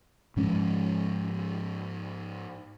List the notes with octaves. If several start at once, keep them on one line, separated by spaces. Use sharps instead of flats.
G#2 F3 G#3 C#4